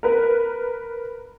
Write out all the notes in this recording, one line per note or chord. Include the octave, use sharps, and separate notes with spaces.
A#4 B4